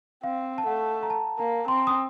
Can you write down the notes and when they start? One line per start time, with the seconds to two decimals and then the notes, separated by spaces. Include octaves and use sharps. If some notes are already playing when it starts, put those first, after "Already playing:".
0.24 C4 F5
0.58 A5
0.66 A3 F#5
1.03 A#5
1.10 A5
1.38 A#3 A#5
1.68 C4 C6
1.87 D#6